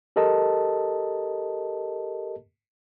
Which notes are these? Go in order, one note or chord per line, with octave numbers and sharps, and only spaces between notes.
G4 A4 A#4 D#5 A5